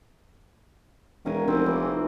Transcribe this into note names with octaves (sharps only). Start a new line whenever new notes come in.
E1 F#4 A#4 G#5
F1 C4
A#2 E3 D6